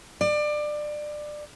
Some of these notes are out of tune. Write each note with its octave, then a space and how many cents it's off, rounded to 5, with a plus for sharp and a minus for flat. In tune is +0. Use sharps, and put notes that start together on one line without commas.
D5 +25